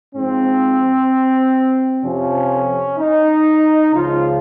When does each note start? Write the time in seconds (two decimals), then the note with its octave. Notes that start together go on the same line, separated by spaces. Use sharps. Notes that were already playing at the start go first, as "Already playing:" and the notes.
0.15 G#2 F3 C4
2.04 F2 C3 F3 C#4
2.98 D#4
3.93 C#2 C#3 F3 F4